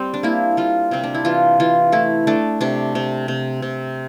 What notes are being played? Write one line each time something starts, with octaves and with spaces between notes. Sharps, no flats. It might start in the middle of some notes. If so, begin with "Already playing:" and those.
Already playing: G3 C4
D4
A#3 E4
G3 F4
C3 C4
D4
E4
E3 F4
E3 F4
A3 E4
A3 D4
C3 D4
C3
C3
C3